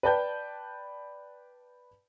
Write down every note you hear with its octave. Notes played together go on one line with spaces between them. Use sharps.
B4 D5 G5 A5 G6